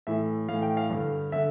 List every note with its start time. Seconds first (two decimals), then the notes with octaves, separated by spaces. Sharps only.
0.07 A2 E3 E5
0.49 A2 E3 F5
0.62 G5
0.77 F5
0.90 G2 D3
1.32 D3 E5